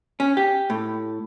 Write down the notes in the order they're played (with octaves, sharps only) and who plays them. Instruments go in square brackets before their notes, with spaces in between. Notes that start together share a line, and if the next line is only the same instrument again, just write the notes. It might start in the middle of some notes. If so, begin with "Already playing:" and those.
[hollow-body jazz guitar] C#4
G4
A2